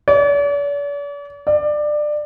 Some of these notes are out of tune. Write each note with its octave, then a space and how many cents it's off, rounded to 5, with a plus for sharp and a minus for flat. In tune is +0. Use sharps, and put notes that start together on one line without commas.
D5 -45
D5 +20